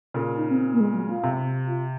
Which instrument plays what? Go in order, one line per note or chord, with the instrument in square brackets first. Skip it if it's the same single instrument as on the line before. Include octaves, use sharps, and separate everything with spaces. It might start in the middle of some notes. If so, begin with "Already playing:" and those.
[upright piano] A#2 C#3
[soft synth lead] D#4
C4
A#3
G#3
F#3
F4
[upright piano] C3
[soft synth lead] F4